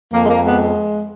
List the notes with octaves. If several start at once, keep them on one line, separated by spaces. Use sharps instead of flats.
F2 A#3
G#3
A#3
G#3 B3